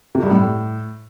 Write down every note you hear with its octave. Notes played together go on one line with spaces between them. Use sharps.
C3
G2
A2